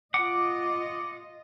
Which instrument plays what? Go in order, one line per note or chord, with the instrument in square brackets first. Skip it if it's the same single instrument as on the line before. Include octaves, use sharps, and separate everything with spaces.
[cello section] F4 D#5 [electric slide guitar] F#5 [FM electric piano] D6